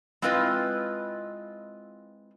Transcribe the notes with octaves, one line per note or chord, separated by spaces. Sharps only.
G#3 C4 E4 F4 B4 D#5